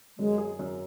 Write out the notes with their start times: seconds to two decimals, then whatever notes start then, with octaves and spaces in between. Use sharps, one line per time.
0.18 F#2 G#3
0.38 G#4
0.59 F#2